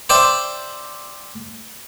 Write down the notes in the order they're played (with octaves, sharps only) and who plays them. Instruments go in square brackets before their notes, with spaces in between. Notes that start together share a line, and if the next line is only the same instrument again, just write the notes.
[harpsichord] C5 D5 E5 G5